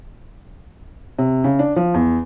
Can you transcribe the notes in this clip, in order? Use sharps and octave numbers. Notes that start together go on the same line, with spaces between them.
C3
C#3
D4
F3
E2